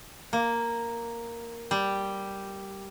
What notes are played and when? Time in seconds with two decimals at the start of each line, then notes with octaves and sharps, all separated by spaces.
0.33 A#3
1.71 G3